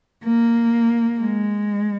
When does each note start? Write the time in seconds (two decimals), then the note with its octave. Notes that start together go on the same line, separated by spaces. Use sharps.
0.24 A#3
1.20 G#3